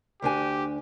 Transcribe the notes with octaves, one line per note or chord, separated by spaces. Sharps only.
D2 D4 G4 G#5